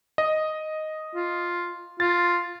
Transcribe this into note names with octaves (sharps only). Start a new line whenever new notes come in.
D#5
F4
F4 A6